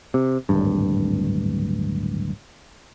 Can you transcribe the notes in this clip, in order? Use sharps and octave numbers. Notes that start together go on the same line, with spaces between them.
C3
D1 G#1 G2